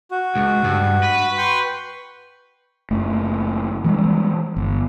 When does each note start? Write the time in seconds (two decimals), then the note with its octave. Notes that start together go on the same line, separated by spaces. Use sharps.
0.11 F#4
0.36 C#2
0.64 G2
1.03 B4
1.38 G5 C6 C#6
2.91 F#1 A3
3.84 E3 G3 G#3
4.56 G1